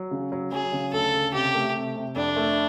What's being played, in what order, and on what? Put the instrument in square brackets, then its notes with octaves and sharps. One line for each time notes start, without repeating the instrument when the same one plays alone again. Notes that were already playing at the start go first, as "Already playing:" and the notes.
Already playing: [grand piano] F#3
C#3
F#3
[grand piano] F#3 [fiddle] G#4
[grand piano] C#3
[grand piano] D2 [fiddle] A4
[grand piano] C#3
[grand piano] C3 [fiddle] G4
[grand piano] A3
C3
C3
[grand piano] F2 [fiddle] D4
[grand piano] A3